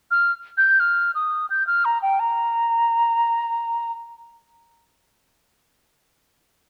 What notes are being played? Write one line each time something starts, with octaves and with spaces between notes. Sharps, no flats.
F6
G6
F6
D#6
G6
F6
A#5
G5
A#5